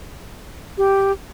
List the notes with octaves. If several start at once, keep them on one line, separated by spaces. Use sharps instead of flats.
G4